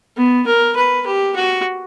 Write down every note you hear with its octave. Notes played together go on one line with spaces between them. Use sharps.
B3
A#4
B4
G4
F#4